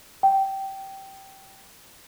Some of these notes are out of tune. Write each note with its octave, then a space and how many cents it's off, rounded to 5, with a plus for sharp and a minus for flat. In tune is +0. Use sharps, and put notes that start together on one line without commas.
G5 -15